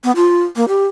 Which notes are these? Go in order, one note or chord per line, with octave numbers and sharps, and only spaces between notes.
B3
F4
A#3
G4